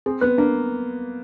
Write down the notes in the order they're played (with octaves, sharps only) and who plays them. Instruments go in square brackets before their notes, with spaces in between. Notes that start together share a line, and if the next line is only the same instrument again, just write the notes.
[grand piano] C4 [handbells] G#4
[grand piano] B3 [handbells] B4
[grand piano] A#3 [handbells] D4